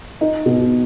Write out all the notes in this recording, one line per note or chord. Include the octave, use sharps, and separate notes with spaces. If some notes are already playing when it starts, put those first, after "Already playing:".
D#4
B2